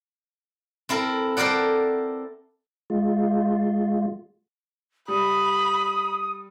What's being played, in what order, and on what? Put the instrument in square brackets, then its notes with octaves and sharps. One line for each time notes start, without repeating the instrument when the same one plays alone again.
[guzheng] C4 E4 A4 A#4
A4 A#4 C5 D5 F#5
[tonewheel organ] G#3 F4
[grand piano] G3 [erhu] B5 [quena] D#6